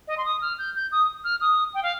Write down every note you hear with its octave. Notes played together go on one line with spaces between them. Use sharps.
D#5
C6
D#6
F6
G6
G6
D#6
F6
D#6
G5
F5